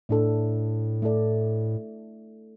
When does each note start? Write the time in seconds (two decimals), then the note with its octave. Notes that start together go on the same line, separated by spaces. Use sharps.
0.09 A2 A3 D4 A4
1.02 A3 E4 A4 D5